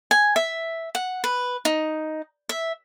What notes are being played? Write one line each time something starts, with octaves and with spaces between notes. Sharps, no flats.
G#5
E5
F#5
B4
D#4
E5